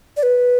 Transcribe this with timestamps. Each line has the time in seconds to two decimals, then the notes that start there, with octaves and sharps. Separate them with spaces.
0.17 D5
0.23 B4